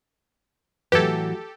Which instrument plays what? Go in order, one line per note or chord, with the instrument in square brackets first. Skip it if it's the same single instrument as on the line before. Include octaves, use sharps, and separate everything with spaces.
[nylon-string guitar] A2 E3 F#3 [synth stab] G4 A4 [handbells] B4 G#6